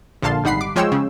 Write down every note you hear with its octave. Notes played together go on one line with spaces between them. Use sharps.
A#1 D3 F5 A5 C6
G#1 G3 D#4 F#5 B5 C7
D6
F3 G#3 C#5 G5 C6 E6
C#3